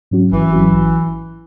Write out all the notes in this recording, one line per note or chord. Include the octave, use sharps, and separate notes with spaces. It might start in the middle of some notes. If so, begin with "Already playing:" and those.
G#2 F#3 C#4 F#4
G#1 E3
G#2 F#3 C#4 F#4
A1